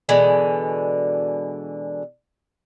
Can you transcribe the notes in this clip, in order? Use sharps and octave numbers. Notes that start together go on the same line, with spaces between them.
B2 D3 E3 G#3